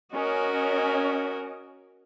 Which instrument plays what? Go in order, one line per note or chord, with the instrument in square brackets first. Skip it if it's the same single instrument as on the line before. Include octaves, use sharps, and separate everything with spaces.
[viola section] C#4 D#5 [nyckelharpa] F#4 A#4